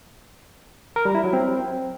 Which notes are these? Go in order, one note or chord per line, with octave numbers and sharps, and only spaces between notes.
A#4
G3
E4
F#3
C4